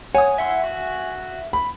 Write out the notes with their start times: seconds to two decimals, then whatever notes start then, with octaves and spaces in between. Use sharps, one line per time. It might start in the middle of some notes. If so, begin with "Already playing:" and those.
0.15 C#5 F#5 G#5 D#6
0.38 E4 E5 F#5 C6
0.64 F#4
1.53 B5